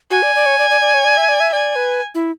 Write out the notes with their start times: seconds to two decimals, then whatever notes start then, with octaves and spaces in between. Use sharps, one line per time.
0.11 F#4 G#5
0.23 D5
0.35 D5
0.46 C#5
0.59 D5
0.70 D5
0.81 D5
0.94 C#5
1.05 D5
1.17 E5
1.29 D5
1.40 E5
1.52 D5 G#5
1.76 B4
2.15 E4